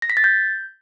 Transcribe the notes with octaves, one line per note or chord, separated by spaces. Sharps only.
A#6
B6
A6
G6